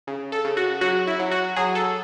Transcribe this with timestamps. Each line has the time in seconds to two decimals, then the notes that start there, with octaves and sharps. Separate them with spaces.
0.07 C#3
0.32 A4
0.45 C#3
0.57 F#4
0.81 F#3 F#4
1.07 E4
1.19 F#3
1.31 F#4
1.56 F#3 G#4
1.75 A4